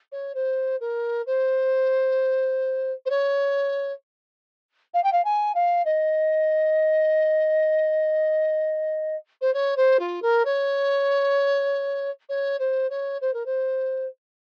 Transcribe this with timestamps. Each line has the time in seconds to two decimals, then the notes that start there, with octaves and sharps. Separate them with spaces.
0.12 C#5
0.35 C5
0.81 A#4
1.27 C5
3.06 C5
3.10 C#5
4.94 F5
5.04 G5
5.12 F5
5.25 G#5
5.55 F5
5.85 D#5
9.41 C5
9.54 C#5
9.77 C5
9.99 F4
10.22 A#4
10.45 C#5
12.29 C#5
12.59 C5
12.90 C#5
13.21 C5
13.34 A#4
13.46 C5